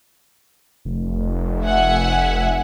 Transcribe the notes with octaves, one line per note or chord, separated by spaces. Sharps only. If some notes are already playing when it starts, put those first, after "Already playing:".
F1
E5 F#5 G#5